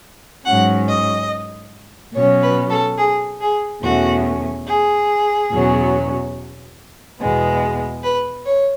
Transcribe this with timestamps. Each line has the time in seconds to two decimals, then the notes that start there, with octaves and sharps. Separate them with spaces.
0.45 G#2 F#3 C#4 F#5
0.87 D#5
2.14 B2 F#3 C#4 C#5
2.42 B4
2.70 A4
2.98 G#4
3.41 G#4
3.83 E2 B2 A3 C#4 F#4
4.67 G#4
5.51 E2 B2 F#3 C#4
7.20 E2 B2 G#3 B3
8.03 B4
8.46 C#5